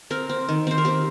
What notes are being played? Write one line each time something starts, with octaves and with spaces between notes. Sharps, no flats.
C4 A#4
C4
D#3
C4 C5
A#4
C4 G4